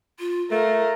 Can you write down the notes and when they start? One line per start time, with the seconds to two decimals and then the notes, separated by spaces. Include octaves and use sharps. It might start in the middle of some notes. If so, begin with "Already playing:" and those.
0.19 F4
0.51 A3 A#4 F5